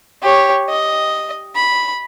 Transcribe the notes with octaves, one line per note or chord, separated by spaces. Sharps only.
G4 C#5
D#5
B5